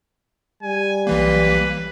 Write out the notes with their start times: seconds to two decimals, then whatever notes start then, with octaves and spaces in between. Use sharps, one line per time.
0.63 G3 G#5
1.07 B1 E3 A#3 B4